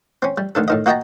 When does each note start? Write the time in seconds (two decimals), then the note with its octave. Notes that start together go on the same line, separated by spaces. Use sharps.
0.22 C4 C#4
0.38 G3
0.55 D2 D#3 D4 A4
0.68 A2 D#3 D#5
0.86 A#3 F#4 D#5 G5 A5 A#5